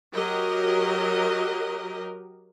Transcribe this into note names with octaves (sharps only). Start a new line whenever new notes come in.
F#3 G4 A#4 D#5